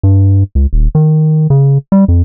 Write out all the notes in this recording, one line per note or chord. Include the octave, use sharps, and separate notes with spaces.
G2
C#2
D#1
D#3
C#3
G3
F2